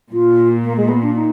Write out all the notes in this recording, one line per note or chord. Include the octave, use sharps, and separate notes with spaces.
A#2 F4
A#3
G#3
B3
D4
D#4